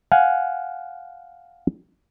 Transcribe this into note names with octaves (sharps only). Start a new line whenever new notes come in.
F5 F#5 G#5